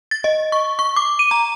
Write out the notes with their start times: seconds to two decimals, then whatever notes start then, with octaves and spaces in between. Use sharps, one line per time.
0.11 A6
0.24 D#5
0.52 C#6
0.79 C#6
0.96 D6
1.19 D#7
1.31 A#5